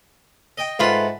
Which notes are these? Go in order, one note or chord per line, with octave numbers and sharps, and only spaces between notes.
D#5 G5
G#2 A3 F4 B4 F5 F#5